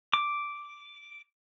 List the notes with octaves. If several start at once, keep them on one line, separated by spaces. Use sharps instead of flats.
D6